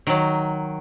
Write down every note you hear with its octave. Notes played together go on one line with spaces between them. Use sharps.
D#3 F#3